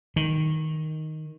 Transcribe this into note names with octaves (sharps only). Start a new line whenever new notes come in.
D#3